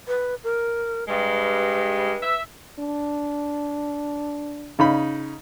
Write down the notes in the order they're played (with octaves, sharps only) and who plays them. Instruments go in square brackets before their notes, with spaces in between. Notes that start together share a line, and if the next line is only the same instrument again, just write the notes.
[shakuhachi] B4
A#4
[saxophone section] G2 G3 G#3 [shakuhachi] B4
[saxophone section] E5
[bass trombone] D4
[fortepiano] C#3 D#4 B5